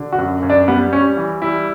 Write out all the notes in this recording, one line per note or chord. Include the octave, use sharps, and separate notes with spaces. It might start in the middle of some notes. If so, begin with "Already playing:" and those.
Already playing: D3
F#4
F#2
F#2
D4
G3 B3
G3 C#4
E3
G3 E4